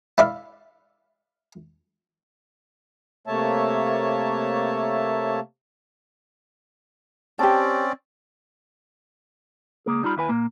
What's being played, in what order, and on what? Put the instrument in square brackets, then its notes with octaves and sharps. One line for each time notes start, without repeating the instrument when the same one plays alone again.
[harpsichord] E4 D5 F5
[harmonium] C3 A3 A#3 C#5 E5 A5
[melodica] C4 C#4 D5 [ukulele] G4 A5
[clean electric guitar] C#2 A#3 G#4
G3 D#4 F4 B5
D#2 E4 B4 G#5
A#2 A#3